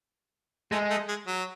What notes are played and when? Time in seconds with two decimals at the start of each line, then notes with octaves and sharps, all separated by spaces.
0.72 G#3 A3
0.90 A3
1.09 G#3
1.27 F#3